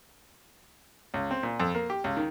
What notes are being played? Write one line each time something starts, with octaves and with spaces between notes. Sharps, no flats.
C#2
C4
A#2
F2
A#3
G4
C#2
D#3